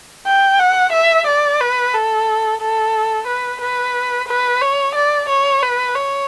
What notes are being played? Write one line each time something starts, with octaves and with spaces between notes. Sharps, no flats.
G5
F#5
E5
D5
B4
A4
A4
B4
B4
B4
C#5
D5
C#5
B4
C#5